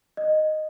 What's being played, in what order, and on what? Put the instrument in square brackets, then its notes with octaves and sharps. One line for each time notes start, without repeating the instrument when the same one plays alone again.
[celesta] D#5